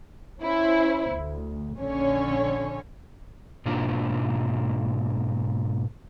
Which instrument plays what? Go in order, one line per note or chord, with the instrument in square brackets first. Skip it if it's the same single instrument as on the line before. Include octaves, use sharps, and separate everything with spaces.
[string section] C#4 E4 C5
D2
A#1 D3 C#4 C#5
[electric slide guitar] G#2 B2 A#3 D4 F4